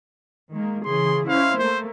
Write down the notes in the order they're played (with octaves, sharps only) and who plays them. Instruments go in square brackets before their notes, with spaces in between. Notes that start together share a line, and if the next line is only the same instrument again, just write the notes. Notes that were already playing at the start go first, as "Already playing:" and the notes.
[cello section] D#3 G#3 A#3
[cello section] C#3 E3 G#4 [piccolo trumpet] C6
[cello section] C#4 E4 C5 [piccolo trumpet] F5
[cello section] A3 A#3 [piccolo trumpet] C5